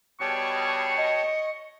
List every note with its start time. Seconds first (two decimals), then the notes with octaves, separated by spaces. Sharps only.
0.21 B2 G3 G#4 C#5 G5 A5 C#6
0.97 D#5